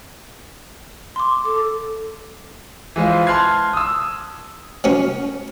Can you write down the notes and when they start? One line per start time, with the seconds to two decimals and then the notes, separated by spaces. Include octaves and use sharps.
1.16 C6 D6
1.45 A4 D6
2.96 E3 G#3 F4 C5
3.26 A5 C6 F6 F#6 G#6 C7
3.73 D#6 E6
4.84 F#3 A#3 C#4